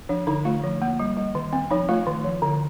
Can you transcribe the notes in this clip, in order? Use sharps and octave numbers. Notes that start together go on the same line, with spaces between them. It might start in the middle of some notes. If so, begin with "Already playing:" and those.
F3 D4
D3 D#4
A3 F4
F3
A#3
G3
G3
D#3
C4
F3 D#4
A3 F4
D#3
F3
D3